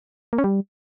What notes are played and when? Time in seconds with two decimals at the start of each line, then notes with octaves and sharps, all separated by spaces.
0.33 A#3
0.38 C#4
0.44 G3